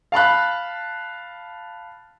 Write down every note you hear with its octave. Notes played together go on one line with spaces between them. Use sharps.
F5 A5 B5 F#6